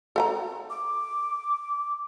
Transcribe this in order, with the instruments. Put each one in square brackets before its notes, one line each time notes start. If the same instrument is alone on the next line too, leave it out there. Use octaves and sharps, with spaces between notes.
[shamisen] A4 F#5 A#5
[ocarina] D6